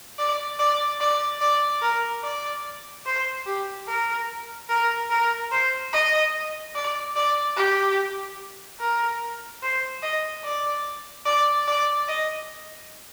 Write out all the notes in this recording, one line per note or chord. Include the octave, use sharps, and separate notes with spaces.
D5
D5
D5
D5
A#4
D5
C5
G4
A#4
A#4
A#4
C5
D#5
D5
D5
G4
A#4
C5
D#5
D5
D5
D5
D#5